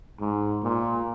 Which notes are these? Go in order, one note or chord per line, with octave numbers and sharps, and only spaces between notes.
G#2
A#2